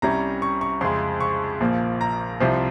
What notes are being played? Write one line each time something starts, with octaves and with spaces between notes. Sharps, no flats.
C2 C3 G3 C#4 A#5
C#6
C#6
F2 C#3 G#3 C6
C#6
A#1 A#2 F3 A#3
A#5
C2 C3 F3 C4